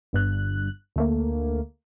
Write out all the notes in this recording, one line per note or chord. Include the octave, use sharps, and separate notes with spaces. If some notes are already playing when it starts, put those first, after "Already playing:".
G1 G2 F#6
D2 A3 A#3